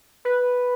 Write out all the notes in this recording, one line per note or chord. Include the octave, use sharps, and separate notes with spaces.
B4